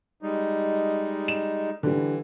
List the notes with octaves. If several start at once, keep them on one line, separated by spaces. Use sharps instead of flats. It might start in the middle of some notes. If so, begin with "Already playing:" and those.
G3 G#3 D#4
E7
D3 E3 G3